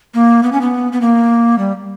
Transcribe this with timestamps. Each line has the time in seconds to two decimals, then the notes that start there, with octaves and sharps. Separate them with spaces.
0.14 A#3
0.43 B3
0.52 C#4
0.61 B3
0.92 B3
1.01 A#3
1.58 G3